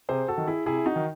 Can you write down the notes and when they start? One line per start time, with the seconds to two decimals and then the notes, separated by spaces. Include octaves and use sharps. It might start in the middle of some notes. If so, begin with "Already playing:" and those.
0.09 C3 G#4 C5
0.28 F#4 A4
0.38 D#3
0.47 E4 G#4
0.66 C3 E4 G#4
0.86 D#4 F#4
0.96 D#3